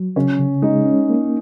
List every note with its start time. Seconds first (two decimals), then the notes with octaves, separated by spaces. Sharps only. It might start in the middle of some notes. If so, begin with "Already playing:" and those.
Already playing: F#3
0.16 C#3 C#4
0.39 C#3
0.62 G#3 D#4
0.86 C#4
1.09 A#3